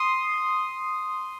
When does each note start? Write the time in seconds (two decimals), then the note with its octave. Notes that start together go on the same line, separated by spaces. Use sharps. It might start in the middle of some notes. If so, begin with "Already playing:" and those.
Already playing: C6 D#6